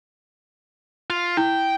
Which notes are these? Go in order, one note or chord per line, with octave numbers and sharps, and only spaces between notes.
F4
E4 G5